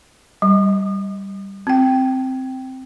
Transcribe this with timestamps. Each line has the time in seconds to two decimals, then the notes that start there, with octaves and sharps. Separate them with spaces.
0.42 G3
1.67 C4 G5